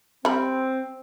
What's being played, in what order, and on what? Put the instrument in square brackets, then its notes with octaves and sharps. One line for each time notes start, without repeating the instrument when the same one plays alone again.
[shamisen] G3 B5 [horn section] C4